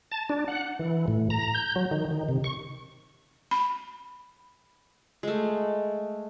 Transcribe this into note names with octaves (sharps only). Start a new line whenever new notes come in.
A5
D4
F#5
E3
A2
A#5
G6
F#3
D#3
D#3
C3
C#6
B5
G#3 A3